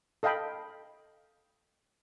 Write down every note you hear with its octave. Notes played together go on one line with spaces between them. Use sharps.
A4 D#5 F5 G5 B5